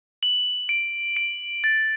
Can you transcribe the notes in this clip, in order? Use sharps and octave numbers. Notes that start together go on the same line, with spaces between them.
F#7
D7
D7
A6